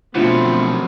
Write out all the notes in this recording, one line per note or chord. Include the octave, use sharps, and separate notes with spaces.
F#2 B2 D3 F3 A3 C4 B4